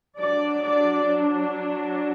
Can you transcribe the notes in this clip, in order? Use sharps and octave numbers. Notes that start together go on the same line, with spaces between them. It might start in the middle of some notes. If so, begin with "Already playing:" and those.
F#3 D4 D5
D5